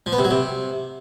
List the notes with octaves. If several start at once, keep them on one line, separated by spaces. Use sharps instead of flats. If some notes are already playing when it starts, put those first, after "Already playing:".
F3
B3
C3
F#3
C3